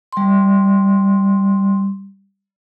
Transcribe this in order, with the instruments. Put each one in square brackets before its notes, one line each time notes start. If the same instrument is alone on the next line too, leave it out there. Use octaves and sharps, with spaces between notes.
[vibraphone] G3 C6